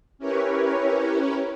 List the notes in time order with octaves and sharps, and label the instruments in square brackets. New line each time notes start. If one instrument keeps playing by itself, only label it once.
[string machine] C#4 E4 G4 A#4 B4 C#5